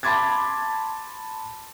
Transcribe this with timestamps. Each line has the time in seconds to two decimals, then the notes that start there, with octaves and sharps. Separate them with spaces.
0.03 A5 B5 C6 D6 G#6 A6